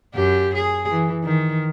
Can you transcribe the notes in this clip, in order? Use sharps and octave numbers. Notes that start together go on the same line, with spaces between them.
F#2 G4
G#4
E3
D#3